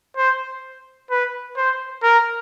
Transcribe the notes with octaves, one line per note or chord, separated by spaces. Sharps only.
C5
B4
C5
A#4